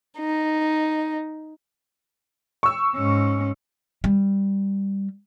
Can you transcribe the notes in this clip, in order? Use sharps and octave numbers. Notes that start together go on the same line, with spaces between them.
D#4
C#6 E6
G#2 C#4
G3